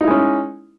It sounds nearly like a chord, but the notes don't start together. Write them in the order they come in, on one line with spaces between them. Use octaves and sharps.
D#4 E4 G#3 C#4